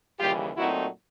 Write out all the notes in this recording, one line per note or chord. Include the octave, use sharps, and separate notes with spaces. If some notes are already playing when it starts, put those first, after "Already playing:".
D#2 C#3 E3 G3 F4 G4
A#2 F#3 A3 C4 D#4 E4 F#4